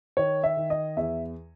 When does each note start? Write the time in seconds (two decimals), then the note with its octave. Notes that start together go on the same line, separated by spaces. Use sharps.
0.17 D#3 C#5
0.43 E5
0.57 D#3
0.70 D#5
0.97 E2 E5